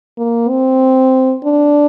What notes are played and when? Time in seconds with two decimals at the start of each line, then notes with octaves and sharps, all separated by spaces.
0.18 A#3
0.49 C4
1.45 D4